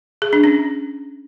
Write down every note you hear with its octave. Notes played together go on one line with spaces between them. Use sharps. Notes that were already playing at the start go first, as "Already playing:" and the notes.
G#4
D4
C#4